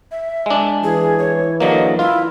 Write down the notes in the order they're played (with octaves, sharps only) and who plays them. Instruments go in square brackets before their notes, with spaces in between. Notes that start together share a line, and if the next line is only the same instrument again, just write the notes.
[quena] E5
[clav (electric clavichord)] G#3 D4
[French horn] E3 [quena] G#4
[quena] C#5
[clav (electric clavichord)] D3 F#3 A#3 [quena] D#5
[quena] E4 [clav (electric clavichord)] F4